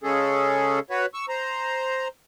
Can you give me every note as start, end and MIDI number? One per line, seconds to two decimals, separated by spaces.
0.03 0.79 49
0.03 0.79 56
0.03 0.79 61
0.03 0.79 68
0.03 0.79 69
0.90 1.06 66
0.90 1.06 71
0.90 1.06 73
1.14 1.26 85
1.14 1.26 88
1.29 2.08 72
1.29 2.08 82